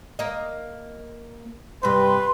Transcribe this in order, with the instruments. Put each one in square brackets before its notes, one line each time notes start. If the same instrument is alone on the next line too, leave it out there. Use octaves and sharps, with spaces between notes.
[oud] A#3 D#5
[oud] G2 C3 [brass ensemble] G3 [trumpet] B4 [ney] C6